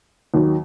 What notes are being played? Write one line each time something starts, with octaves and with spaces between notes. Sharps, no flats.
D#2 D#3 F#3